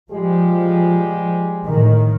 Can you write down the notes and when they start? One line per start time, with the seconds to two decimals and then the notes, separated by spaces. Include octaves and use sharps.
0.12 F3 G3 G#3 G4
1.66 A2 D#3